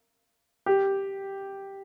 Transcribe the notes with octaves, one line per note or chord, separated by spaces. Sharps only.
G4